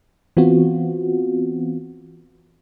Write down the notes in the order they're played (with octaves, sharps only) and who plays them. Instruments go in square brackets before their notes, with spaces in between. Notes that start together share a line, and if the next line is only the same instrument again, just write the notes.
[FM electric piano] E3 B3 C4 F4 F#4